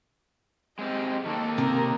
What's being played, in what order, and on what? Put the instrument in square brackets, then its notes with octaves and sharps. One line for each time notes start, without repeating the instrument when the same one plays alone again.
[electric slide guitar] G#3 C4 G4 [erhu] D#5
[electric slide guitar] D#3 A#3 [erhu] A4
[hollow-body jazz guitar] C3 [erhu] A#4